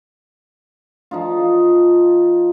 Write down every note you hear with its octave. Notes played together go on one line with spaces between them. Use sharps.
F3 D#4 F4